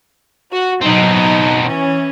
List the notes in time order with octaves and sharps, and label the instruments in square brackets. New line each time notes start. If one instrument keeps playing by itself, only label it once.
[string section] F#4
[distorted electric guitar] B2 C4 [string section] F#3 D#4
[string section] E3 C#4